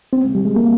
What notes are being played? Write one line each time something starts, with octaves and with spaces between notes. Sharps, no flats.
C4
G#3
G3
G#3
A#3